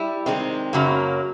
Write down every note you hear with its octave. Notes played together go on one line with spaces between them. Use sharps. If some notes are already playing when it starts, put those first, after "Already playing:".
Already playing: G3 E4
C3 D#3 G#3 C4
F#2 C#3 F#3 A#3